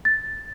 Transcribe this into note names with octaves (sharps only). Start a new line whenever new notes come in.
A6